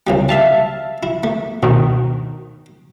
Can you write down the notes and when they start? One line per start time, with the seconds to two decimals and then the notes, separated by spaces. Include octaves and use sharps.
0.07 C2 C#3 G3
0.29 G3 E5 F5 A5
1.03 E4
1.24 A3
1.63 D2 B2 D#3